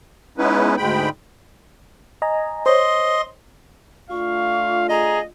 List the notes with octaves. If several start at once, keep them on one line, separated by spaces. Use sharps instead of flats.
G#3 B3 C#4 D#4 E4 B4
D2 G#2 G#3 G5 B5
D#5 G#5 A#5
C5 C#5 D#5 C6
A3 D4 F4 F5 C#6
G#4 D#5 A#5